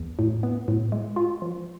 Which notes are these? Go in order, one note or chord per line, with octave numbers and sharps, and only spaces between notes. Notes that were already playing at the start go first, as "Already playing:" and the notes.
Already playing: E2
A2
B3
A2
G#3
F4
F3